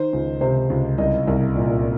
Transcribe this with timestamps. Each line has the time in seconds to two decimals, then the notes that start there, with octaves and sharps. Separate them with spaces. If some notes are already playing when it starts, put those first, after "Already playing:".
Already playing: D#3 C5
0.13 C#2
0.41 C3 C5
0.70 C#2
0.98 C2 D#5
1.27 C2
1.55 A#2